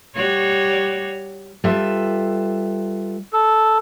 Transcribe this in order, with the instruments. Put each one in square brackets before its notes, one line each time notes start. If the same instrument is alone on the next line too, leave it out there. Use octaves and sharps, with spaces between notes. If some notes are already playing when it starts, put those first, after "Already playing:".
[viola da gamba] G3 F#4 C#5
[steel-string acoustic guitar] G3 F4 A4 B4 E5
[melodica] A4